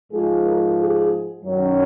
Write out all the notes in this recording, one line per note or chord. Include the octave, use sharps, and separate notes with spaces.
G#2 F3 G#3 G#4
A#4
G#4
F#2 D#3 F#3 C#4